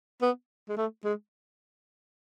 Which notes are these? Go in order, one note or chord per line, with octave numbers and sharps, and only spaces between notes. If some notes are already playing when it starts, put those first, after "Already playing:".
B3
G#3
A3
G#3